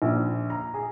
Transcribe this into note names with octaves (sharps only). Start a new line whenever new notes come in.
A#1
A#5
G#4